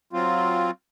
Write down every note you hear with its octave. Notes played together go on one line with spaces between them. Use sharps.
F#3 C4 F4